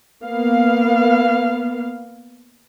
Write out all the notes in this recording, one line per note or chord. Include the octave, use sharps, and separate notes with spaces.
A#3 B3 F5